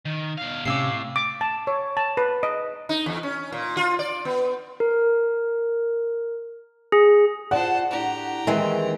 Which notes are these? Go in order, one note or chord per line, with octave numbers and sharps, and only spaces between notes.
D#3
B2 F5
A2 C3 C#4 F5 D6 E6 C7
D6
A5
C#5
A5
B4
D#5
D#4
E2
C#4
A#2
F4
D5
B3
A#4
G#4
F4 C5 D5 F#5 A5
A2 D4 G4 A#5
D#2 D#3 E3 G#3 C4 G#5